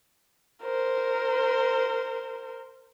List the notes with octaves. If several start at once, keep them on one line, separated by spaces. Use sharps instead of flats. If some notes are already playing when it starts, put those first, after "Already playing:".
A#4 C5